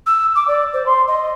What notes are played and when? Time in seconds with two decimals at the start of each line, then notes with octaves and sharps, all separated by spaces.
0.07 E6
0.35 D6
0.48 D5
0.74 C5
0.86 C6
1.08 D#5